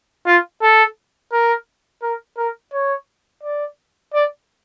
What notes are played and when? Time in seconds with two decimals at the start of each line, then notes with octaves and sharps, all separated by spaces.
0.26 F4
0.62 A4
1.32 A#4
2.03 A#4
2.38 A#4
2.73 C#5
3.43 D5
4.14 D5